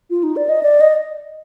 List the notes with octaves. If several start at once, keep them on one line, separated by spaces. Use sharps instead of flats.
F4
D#4
D5
D#5
D5
D#5